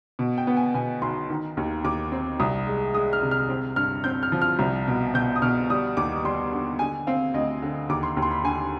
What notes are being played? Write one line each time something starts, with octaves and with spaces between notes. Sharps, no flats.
B2
G5
B3
G#5
B2 G#5
B1 C6
D#3
D#2
D#2 D6
C4
C2 D#6
G#3
G#3 D#6
F6
C3
F6
C4
G2 F6
C4 G6
F6
F3
F6
C2
B2
B2 G6
D#6
B2 F6
G3 D#6
D#2 D6
G3 C6
D3
D3 G#5
C4 F5
D2 D#5
D3
D#2 D6
C6
D#2
C6
B5
D3 G#5